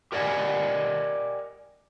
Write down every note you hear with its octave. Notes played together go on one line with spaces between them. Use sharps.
G4 A#4 D5 D#5 F#5 G#5